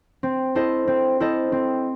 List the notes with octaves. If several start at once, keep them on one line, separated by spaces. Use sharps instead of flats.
C4
E4 A4 C5 D#5
C4
E4 A4 C5 D#5
C4